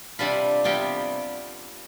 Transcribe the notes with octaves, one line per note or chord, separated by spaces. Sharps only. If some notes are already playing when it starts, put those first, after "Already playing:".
C3 G3 D4 F4 B5
C3 G3 B3 F4 G5